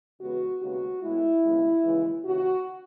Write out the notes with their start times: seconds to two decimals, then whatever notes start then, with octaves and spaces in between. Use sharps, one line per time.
0.20 E2 C#3 G#3 B3 F#4
0.60 D#2 C#3 G#3 B3 F#4
1.02 A2 G#3 B3 E4
1.42 D#2 C#3 G#3 B3
1.83 D#2 C#3 E3 G#3
2.24 D#2 C#3 E3 F#4